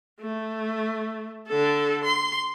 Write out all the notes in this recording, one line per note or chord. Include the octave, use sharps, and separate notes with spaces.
A3
D3 A4
C6